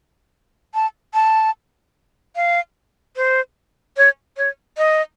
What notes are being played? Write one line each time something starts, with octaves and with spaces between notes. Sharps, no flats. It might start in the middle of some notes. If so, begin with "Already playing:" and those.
A5
A5
F5
C5
C#5
C#5
D#5